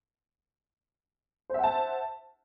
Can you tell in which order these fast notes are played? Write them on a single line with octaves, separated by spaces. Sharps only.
C5 E5 F#5 A5